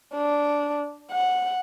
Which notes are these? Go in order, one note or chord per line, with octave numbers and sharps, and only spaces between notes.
D4
F#5